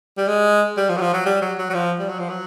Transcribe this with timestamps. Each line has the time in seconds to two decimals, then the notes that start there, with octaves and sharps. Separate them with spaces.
0.17 G3
0.28 G#3
0.77 G3
0.89 F3
0.97 F#3
1.01 F3
1.13 F#3
1.25 G3
1.42 F#3
1.58 F#3
1.70 F#3
1.74 F3
1.99 G3
2.09 F#3
2.19 F3
2.29 F#3